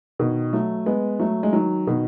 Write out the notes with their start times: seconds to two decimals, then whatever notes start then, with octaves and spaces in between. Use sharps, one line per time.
0.19 B2 D#3
0.53 F#3 A3
0.86 G#3 B3
1.20 F#3 A3
1.43 G#3
1.53 D#3 F#3
1.87 B2 D#3